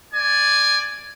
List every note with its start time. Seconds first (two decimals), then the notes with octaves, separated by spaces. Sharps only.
0.14 D5 G#5